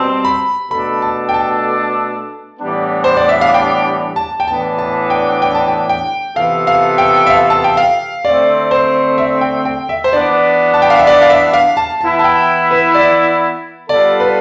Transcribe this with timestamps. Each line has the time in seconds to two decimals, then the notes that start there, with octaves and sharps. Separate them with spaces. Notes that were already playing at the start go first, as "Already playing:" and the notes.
Already playing: B2 G3 C4 A5
0.25 B5
0.71 B2 A3 D4 A4 B5
1.02 A5
1.29 G5
1.34 A5
2.59 A2 E3 G3 B3 D4
3.04 C5
3.17 D5
3.29 E5
3.41 F5
3.54 G5
4.16 A5
4.40 G5
4.48 A2 E3 B3 D4 A5
4.79 A5
5.10 G5
5.42 G5
5.55 A5
5.68 G5
5.89 G5
6.36 C3 E3 B3 F4 A4 F5
6.67 F5
6.98 G5
7.26 E5
7.30 F5
7.50 A5
7.64 G5
7.77 F5
8.25 D3 A3 C4 D5
8.71 C5
9.18 E5
9.41 G5
9.65 G5
9.89 E5
10.04 C5
10.13 E3 B3 D4 D5
10.74 A5
10.82 G5
10.90 F5
10.99 E5
11.07 D5
11.22 F5
11.30 E5
11.53 F5
11.77 A5
12.00 E3 B3 E4 A5
12.19 A5
12.24 G5
12.71 B4
12.94 D5
13.89 G3 B3 F4 A4 D5
14.20 B4